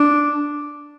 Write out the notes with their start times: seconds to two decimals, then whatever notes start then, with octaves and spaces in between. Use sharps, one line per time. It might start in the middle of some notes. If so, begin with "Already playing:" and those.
Already playing: D4